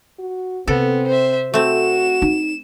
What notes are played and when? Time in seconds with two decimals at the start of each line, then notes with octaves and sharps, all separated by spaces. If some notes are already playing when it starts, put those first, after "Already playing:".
0.19 F#4
0.68 C3 B3 C4 A4
1.07 C5 E5
1.54 A3 C4 F#4 E7
2.22 D#4